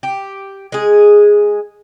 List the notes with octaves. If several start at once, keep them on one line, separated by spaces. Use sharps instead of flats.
G4
G#3 G#4